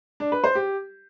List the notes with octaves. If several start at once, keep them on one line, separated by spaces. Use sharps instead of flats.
D4
B4
C5
G4